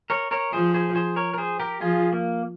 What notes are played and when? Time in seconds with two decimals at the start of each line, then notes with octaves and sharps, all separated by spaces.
0.10 A#4 C#5
0.31 A#4 C#5
0.52 F3 G#4 C5
0.74 G#4 C5
0.95 G#4 C5
1.16 A#4 C#5
1.34 A#4
1.38 G#4 C5
1.59 G4 A#4
1.81 F3 F4 G#4
2.13 A#3